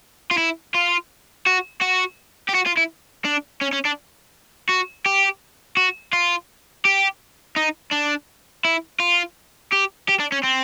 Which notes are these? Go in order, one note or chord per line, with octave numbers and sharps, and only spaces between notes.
F4
E4
F4
F#4
F#4
G4
F#4
F4
E4
D4
C#4
C#4
D4
F#4
G4
F#4
F4
G4
D#4
D4
E4
F4
G4
G4
D4
C#4
C4